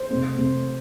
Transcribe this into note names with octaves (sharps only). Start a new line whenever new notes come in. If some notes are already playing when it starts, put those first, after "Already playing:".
Already playing: C5
C3 A3 C4
C3 A3 C4